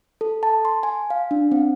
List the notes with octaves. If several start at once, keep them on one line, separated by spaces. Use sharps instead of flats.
A4
A5
C6
G#5
F5
D4
C4